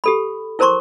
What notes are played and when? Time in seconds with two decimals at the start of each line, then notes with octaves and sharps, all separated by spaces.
0.04 G4 A4 B5
0.59 E4 A#4 C5 A#5 C6 C#6